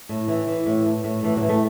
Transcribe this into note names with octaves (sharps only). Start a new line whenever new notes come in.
A2
E3
E3 E4
A2
A2
A2
A2 E3
F#3
E3
A3